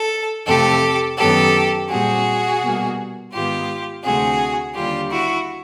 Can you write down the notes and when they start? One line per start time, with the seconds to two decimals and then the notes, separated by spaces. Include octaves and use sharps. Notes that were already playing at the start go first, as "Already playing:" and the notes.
Already playing: A4
0.46 F2 C3 F3 A3 G4 A4
1.18 F#2 D#3 F#3 B3 G4 A4
1.89 A#2 G3 C4 F#4 G#4
2.61 B2 G3 A#3
3.33 G#2 D#3 G#3 B3 F4 G4
4.04 D2 C3 F3 A3 C4 F#4 G#4
4.75 D#2 D3 G3 F4 G4
5.11 E4 F#4